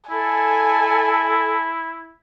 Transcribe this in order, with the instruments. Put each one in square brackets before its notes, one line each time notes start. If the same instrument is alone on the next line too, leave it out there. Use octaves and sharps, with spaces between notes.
[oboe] E4 [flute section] A4 [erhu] G#5